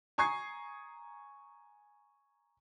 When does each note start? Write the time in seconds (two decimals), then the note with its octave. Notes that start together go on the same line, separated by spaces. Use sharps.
0.18 G#5 A#5 C#6 D#6 G#6 C7